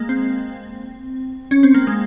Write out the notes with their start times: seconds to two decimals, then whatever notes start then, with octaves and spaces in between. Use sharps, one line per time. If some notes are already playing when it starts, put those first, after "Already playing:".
Already playing: G#3 A#3
0.09 C4
1.51 C#4
1.63 C4
1.74 A#3
1.87 G#3